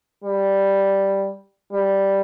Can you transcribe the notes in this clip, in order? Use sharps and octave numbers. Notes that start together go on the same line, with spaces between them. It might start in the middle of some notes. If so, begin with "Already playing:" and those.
G3
G3